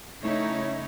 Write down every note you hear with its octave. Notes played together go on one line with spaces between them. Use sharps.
C#3 A3 C#4 D#4 E4 C#5